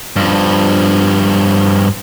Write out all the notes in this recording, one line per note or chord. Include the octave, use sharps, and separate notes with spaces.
G2 F3